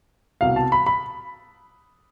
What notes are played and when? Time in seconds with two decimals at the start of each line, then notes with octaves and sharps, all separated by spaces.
0.41 C2 B2 F5
0.56 A5
0.72 B5
0.87 B5